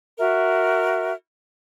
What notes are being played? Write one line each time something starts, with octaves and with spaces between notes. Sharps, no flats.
F#4 A#4 E5